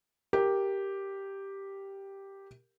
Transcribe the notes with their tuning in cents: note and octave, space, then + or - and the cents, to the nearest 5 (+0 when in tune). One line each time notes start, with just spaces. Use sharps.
G4 +0 A#4 +0